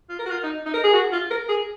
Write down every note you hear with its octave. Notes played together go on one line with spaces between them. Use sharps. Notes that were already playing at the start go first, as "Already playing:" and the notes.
F4
A#4
F#4
F4
D#4
D#4
A#4
G#4
F#4
F4
A#4
G#4